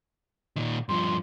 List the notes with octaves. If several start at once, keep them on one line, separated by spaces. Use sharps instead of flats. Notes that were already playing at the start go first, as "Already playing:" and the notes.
A#2 D#3
G2 F3 C6